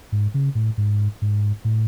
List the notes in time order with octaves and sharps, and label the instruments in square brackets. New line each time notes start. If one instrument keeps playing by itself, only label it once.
[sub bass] G#2
C#3
A2
G#2
G#2
A2